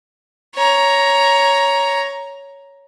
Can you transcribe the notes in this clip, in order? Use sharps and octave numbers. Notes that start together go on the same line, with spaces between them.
C#5 A#5